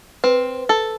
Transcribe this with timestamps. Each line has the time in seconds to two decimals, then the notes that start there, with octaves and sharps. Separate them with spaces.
0.24 C4 B4
0.69 A4